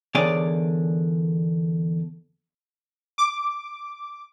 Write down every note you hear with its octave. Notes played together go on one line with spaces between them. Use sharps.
E2 D3 D#3 G#4 C#5 D5
D6